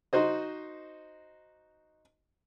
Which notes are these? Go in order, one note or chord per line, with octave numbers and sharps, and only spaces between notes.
D#4 F#4 C5 D#5